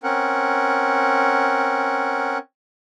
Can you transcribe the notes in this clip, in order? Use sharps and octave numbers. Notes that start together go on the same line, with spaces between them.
C4 C#4 A#4 F#5